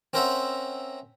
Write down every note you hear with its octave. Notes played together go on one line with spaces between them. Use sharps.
C4 C#4 A#4 C5 E5 F#5